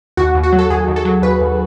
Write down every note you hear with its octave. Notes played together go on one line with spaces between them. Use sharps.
D#2 F#4
D#2
F#4
F#3
A4
D#2 G#4
D#2
A4
F#3
D#2 B4
D#2